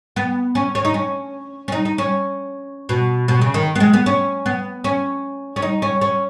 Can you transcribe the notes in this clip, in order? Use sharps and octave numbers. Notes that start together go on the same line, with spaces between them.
B3
C#4
C#4
D#4
C#4
C#4
D#4
D#4
C#4
B2
B2
C#3
D#3
B3
G#3
B3
C#4
B3
C#4
C#4
D#4
C#4
C#4